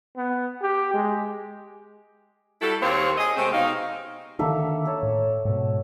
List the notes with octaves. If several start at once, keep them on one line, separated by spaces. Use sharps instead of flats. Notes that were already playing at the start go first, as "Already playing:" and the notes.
B3
G4
G#3
G3 E4 F#4 A4
D#2 A#3 C4 G4 C#5
G#4 D#5
C3 G#3 A3 C4
B2 D#4 C#5 F5
D3 D#3 A#3 D4 A4 E5
A4 C#5 A5
A2
G#2 B2